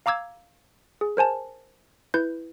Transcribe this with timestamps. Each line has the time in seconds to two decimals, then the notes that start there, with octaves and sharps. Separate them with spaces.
0.06 F5 A#5 D6 E6 G#6
1.01 G#4
1.17 A#4 C5 G#5 A5
2.14 E4 B4 G6